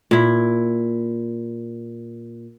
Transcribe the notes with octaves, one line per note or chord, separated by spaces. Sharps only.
A#2 E4